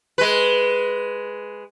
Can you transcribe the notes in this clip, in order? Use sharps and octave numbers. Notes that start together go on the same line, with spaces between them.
G#3 B4